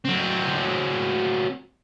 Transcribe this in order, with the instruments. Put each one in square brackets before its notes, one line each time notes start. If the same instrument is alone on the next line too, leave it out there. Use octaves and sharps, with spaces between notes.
[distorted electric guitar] F#3 C4